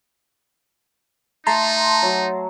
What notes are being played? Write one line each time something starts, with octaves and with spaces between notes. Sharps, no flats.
A3 D#4 A5 A#5 C6
F#3